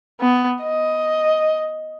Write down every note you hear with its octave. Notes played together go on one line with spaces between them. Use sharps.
B3
D#5